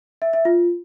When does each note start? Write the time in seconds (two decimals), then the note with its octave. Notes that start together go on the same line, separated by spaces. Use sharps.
0.22 E5
0.33 E5
0.45 F4